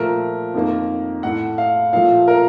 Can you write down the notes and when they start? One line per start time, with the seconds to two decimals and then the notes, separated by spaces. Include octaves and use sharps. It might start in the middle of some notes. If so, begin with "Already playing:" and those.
Already playing: A#2 F3 A3 A#4
0.54 F2 D#3 A#3
1.23 A2 A3 F#5
1.58 F5
1.93 A#2 F3 A3 F5
2.28 A#4